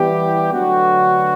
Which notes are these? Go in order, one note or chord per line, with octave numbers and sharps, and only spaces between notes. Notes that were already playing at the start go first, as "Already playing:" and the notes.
Already playing: E3 G3 B3 E4 G4
D2 D3 F#3 B3 F#4